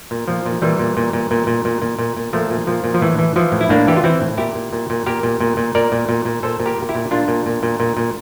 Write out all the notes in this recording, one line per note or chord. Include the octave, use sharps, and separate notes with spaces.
A#2
A#2 F3
A#2
A#2 E3 G3
A#2
A#2
A#2
A#2
A#2
A#2
A#2
A#2
A#2
A#2 F3 A3
A#2
A#2 F3
A#2
F3
A2 E3
E3
E3 F3
A2
E4
A2 A#3 D4
E3 G4
F4
E3 C4 E4
A2
A#2 E4 G4
A#2
A#2
A#2
A#2 G4 A#4
A#2
A#2
A#2
A#2 A#4 D5
A#2
A#2
A#2
A#2 A4 C5
A#2
G4 A#4
A#2
E4 G4
A#2
A#2 D4 F4
A#2
A#2
A#2
A#2
A#2